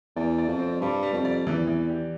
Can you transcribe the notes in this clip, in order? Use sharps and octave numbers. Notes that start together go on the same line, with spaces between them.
E2 D5
D5
F2
C4
G2 G3
G3
F2
D5
E2 E3
E3
G4